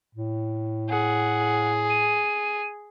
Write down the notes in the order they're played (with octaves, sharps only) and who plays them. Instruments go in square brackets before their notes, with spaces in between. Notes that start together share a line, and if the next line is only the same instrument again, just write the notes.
[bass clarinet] A2
[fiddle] G#4 [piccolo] F#5
[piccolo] D#7